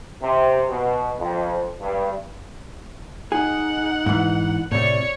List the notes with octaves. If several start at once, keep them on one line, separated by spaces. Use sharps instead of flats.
C3
B2
F2
G2
D#4 G#4 F#5
G#2 E3
A2 C3 C#5 D5 C#7